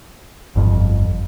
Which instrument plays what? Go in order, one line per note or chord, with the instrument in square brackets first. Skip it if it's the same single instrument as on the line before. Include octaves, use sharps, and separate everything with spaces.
[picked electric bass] G1 F2